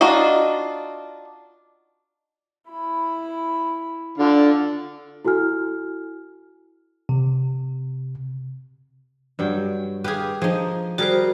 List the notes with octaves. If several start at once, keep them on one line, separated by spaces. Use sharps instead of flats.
D4 D#4 F4 F#4 D#5
E4 B5
D3 F4
E4 F#4 A4 G#5 F6
C3
G2 F#3 G5
G4 G#4 B4 F5
F3 D#4 G#4
G3 F#4 G#4 A#4 C5